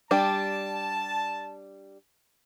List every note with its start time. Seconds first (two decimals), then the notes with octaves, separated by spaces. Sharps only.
0.11 G3 D4 G4 A5